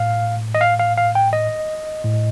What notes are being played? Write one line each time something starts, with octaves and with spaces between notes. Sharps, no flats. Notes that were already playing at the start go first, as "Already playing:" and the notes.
Already playing: A2 F5
D#5
F5
F5
F5
G5
D#5
A2